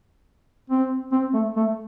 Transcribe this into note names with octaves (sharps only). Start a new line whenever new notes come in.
C4
C4
A3
A3